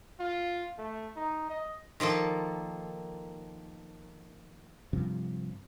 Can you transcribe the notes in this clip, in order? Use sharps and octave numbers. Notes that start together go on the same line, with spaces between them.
F4
A3
D#4
D#5
D#3 F3 A#3 A4
G2 C3 F3